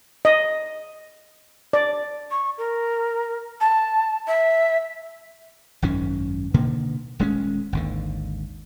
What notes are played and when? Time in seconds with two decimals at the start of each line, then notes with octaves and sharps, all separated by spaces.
0.25 D#5
1.73 D5
2.31 C#6
2.58 A#4
3.61 A5
4.27 E5
5.82 G#1 F#2 D#3 C#4
6.54 B2 D3 D#3 A#3
7.19 D#1 G#3 A#3 C#4
7.73 G#1 D#2 D3